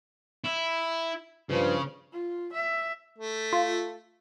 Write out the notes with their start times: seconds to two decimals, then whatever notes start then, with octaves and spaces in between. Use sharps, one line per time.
0.44 E4
1.50 G2 C#3 F3
2.13 F4
2.53 E5
3.18 A3
3.53 F4